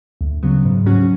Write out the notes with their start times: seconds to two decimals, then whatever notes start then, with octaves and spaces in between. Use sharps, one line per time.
0.21 D2
0.43 C#3 F#3 B3
0.65 G#2
0.86 F#3 C#4 F#4